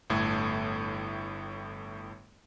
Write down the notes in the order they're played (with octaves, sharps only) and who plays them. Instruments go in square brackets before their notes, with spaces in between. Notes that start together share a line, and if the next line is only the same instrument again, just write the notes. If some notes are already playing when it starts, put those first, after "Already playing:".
[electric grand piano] G1 A2 A3 G#6